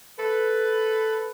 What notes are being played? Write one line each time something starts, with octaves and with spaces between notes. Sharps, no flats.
A4 B4